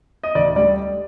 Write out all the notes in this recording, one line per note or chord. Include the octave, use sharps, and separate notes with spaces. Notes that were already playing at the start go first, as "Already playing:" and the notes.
D#5
D2 D5
G3 D5